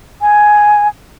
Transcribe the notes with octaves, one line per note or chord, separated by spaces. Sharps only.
G#5